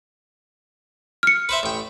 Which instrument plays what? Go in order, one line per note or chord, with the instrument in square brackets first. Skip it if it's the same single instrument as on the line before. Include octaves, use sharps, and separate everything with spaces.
[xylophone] F6 C#7
[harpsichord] B4 C5 E5
A1 G5